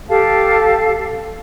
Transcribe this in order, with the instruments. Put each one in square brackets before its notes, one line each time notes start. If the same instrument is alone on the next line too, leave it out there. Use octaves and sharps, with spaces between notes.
[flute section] G4 A4 F5 A5